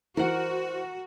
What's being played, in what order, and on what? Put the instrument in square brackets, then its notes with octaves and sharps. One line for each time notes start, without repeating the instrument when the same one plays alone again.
[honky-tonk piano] E3 [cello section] F#4 [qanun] A#4 F#5 [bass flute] C5